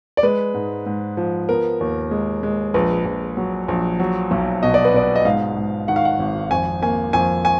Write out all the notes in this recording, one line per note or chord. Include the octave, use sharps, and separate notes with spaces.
D5
G#3 B4
G#2
G#2
F3
B3 A#4
D#2
G#3
G#3
A#1 B4
A#1
F#3
A#1
F#3
B1
B2 D#5
D5
B4
B2 D5
D#5
G#2 F5
G#2
D#3 F#5
F5
F#5
G#1
F2 G#5
A#3 G#5
F2 G#5
G#5